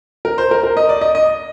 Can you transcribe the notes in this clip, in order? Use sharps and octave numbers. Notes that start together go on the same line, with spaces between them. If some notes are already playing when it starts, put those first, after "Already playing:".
A#4
C5
A#4
A#4
D#5
D5
D#5
D#5